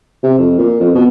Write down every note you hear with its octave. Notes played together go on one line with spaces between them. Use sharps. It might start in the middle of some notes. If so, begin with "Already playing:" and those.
C3
F2
A#2
F2
B2